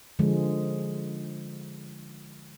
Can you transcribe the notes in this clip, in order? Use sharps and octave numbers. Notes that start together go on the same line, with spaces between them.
D3 F3 G#3